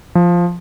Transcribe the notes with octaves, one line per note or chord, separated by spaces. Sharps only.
F3